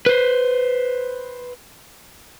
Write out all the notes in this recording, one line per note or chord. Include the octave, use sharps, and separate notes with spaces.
B4 C5